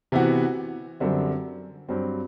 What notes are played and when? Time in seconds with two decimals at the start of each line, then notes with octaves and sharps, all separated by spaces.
0.12 C3 E3 B3 F#4
1.00 F#2 D3 G3 C4
1.89 G2 F#3 C4